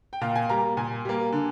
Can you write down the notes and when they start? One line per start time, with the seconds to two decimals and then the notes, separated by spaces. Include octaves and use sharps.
0.13 G5
0.21 A#2 F5
0.36 G#5
0.49 G3 A#3 A#5
0.77 A#2 G#5
1.05 G3 A#3
1.32 D3